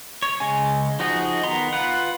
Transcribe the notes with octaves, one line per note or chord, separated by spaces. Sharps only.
C#5
C#3 G#3 C#4 G#5
F3 D#4 F#4 G#4
D#3 B3 A#5 C6
F4 B4 F#5